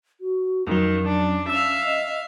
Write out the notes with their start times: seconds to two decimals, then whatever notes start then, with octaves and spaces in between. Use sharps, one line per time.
0.21 F#4
0.67 F2 D#3 F#3 C#4
1.07 D4
1.50 E5 F5 E6
1.85 D#5